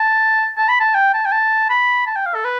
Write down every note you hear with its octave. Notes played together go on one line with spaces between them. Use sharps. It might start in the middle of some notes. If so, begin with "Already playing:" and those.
Already playing: A5
A5
B5
A5
G5
A5
G5
A5
B5
A5
G5
F5
A4
B4